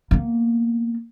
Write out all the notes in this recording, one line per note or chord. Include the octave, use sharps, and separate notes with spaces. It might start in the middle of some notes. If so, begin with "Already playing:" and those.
A#3 B3